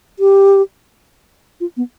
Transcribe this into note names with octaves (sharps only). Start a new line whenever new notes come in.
G4
F4
B3